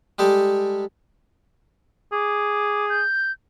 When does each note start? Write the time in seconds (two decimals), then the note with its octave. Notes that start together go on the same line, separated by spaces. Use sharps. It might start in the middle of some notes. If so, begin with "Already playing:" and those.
0.19 G3 G#3 G4 A4
2.12 G#4 D6
2.89 G6